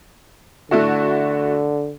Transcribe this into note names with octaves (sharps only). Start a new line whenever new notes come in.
D3 A3 E4 F#4